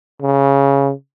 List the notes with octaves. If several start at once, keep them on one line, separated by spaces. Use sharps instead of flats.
C#3